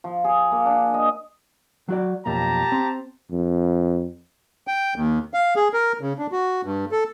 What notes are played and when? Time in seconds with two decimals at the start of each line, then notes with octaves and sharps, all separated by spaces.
0.04 F3
0.24 G#4
0.52 A#3
0.66 D4
0.94 D#5
1.88 F#3 F#4 D5
2.26 B1 F2 A#3 G4 A5 A#5
2.72 C4
3.32 F2
4.67 G5
4.96 D#2
5.34 F5
5.56 G#4
5.73 A#4
6.01 C#3
6.19 D4
6.32 F#4
6.64 G2
6.92 A4